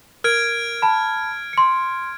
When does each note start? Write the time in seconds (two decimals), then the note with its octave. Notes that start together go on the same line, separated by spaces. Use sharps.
0.24 A#4 F6 G#6 D7
0.82 A5 B5
1.53 C6 C#7